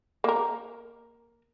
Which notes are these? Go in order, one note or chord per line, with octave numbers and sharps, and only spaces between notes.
A#3 A#4